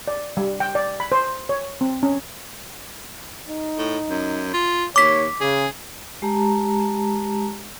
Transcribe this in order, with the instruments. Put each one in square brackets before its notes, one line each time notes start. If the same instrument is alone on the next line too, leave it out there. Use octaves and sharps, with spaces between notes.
[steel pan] D5
G3
G5
D5
B5
C5
C#5
C4
C#4
[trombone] D#4
[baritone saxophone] A2
F#2
F4
[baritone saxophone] D#2 [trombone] C#5 [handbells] D6 B6
[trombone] C#3 [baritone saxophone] G#4
[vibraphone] G#3 G4 A5 A#5